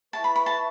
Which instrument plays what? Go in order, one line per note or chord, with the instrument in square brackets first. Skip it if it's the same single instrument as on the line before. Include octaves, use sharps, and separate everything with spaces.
[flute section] E4 B4 E5 C#6 [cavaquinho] A5
[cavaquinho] B5
B5
A5